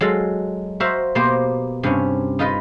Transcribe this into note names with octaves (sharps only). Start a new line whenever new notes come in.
F#3 G#3 A4 F5
F#4 A#4 C5 E5 F5
B2 A#3 G4 C5
G2 C3 C#4
D#4 F4 A#4 B4 D#5